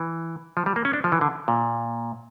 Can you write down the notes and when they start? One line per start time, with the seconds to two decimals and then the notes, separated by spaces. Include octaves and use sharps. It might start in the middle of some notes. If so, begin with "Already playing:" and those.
Already playing: E3
0.57 F3
0.66 G3
0.76 A#3
0.85 C#4
0.93 D4
1.04 F3
1.12 E3
1.21 D3
1.48 A#2